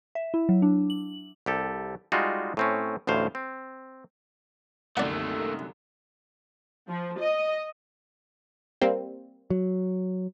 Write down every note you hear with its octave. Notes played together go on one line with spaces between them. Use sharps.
E5
E4
F#3
D4
F#7
C2 G4 A4
G3 G#3 D#4 F4 F#4
A2 C4 C#4
A1 D2 A2 C5 F5
C4
C2 F#2 D3 D#3 A3 A#3 D5 F#5
F3
D#5
G3 A#3 C4
F#3